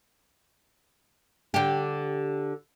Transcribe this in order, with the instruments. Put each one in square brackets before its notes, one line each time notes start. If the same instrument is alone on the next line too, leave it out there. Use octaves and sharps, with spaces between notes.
[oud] D3 G4